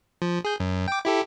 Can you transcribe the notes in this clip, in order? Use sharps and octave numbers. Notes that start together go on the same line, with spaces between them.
F3
G#4 G6
F#2
G5 D6
E4 G4 A4